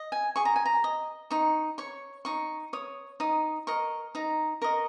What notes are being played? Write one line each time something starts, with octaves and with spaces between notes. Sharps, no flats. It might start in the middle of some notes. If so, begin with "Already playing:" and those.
Already playing: D#5
G#5
G#4 C#6
A#5
G#5
A#5
D#5
D#4 C#6
C#5 C#6
D#4 C#6
C#5 D#6
D#4 D#6
A#4 D#5 C#6
D#4 A#5
A#4 D#5 C#6